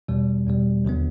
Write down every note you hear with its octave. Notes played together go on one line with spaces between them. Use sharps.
E2 B2 G3
E2 B2 G3
D#2 D3 F#3 B3